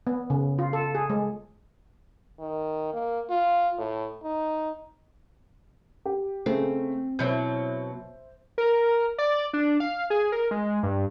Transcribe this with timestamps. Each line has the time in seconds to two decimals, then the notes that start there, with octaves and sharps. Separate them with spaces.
0.07 B3
0.30 C#3
0.59 F4
0.73 A4
0.95 G#4
1.10 G#3
2.40 D#3
2.94 A#3
3.30 F4
3.78 A2
4.23 D#4
6.05 G4
6.46 C#3 A3 C4
7.19 B2 F#3 E4 C5 E5 G6
8.58 A#4
9.18 D5
9.53 D4
9.80 F5
10.10 G#4
10.32 A#4
10.51 G#3
10.83 G2